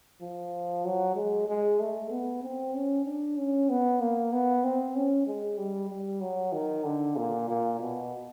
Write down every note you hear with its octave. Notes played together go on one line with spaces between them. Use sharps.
F3
F#3
G#3
G#3
A3
B3
C4
C#4
D4
C#4
B3
A#3
B3
C4
C#4
G#3
G3
G3
F#3
D#3
D3
A#2
A#2
B2